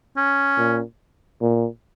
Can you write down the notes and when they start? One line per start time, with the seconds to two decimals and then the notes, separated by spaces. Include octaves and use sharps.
0.17 C#4
0.58 A#2
1.42 A#2